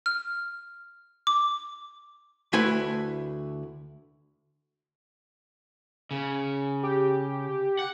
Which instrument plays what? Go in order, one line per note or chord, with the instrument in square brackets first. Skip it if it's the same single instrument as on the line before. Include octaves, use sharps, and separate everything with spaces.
[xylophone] F6
D6
[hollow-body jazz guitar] D2 A3 E4 B4 G#5
[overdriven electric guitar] C#3
[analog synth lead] G4
[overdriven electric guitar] F#5